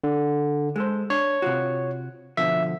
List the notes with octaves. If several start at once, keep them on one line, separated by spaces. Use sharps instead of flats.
D3
G#3 A4 C5
D4 C#5
C3 F4 F#4
B2 D3 F3 E5